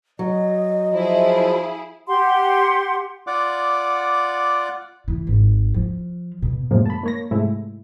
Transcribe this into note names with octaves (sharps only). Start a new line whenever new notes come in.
F#3 D#5
F3 E4 G#4
G4 F#5 C6
F4 D5 F#5 D6
E3
G#1
F3
B2
F#2 A2 C3 F3 G#3 A#3
A5 B5
A#3 C#5 A#6
G#2 C3 G#3 A3 E4